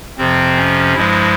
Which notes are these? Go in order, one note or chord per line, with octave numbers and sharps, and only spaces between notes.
F2 C3 F3 C4
C#4
G2 F3 G#3 E4